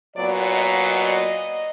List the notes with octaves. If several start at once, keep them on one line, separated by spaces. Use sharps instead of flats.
A#2 F#3 B3 D5
D#5
D#5